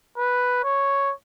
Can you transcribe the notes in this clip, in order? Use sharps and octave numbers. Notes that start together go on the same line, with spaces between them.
B4
C#5